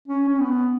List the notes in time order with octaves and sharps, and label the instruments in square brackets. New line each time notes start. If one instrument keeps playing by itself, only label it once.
[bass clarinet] C#4
C#4
B3